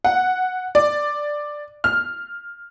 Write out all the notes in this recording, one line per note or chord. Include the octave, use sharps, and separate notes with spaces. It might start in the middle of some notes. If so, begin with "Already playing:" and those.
F#5
D5
F6